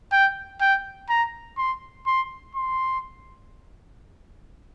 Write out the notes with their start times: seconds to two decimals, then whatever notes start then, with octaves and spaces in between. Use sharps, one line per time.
0.12 G5
0.61 G5
1.10 A#5
1.58 C6
2.07 C6
2.55 C6